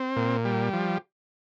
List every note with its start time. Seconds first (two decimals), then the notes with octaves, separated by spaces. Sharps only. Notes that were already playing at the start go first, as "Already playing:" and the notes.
Already playing: C4
0.16 A#2
0.45 G3
0.73 F3